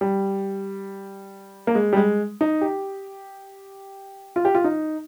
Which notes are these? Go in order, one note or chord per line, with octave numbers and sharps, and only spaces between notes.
G3
A#3
G#3
G3
G#3
D#4
G4
F4
G4
F4
D#4